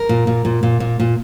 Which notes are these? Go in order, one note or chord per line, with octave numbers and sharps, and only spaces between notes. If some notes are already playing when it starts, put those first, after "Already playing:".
Already playing: A#4
A#2
A#2
A#2
A#2
A#2
A#2